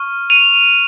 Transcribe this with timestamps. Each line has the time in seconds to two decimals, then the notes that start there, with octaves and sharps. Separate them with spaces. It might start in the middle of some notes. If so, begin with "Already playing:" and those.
Already playing: C#6 F6
0.30 D#7 F7